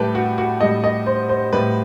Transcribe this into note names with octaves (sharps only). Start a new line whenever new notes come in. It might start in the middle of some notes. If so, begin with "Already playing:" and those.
Already playing: A2 G3 G4 A4 B4
F#4
F#4
A2 G3 D#5
D#5
C5
C5
A2 G3 B4